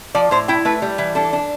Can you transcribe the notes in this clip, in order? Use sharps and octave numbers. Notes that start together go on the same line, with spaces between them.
F3 D5
A2 C5
E4 G5
A3 B4
G3
E3
D4 A4
D4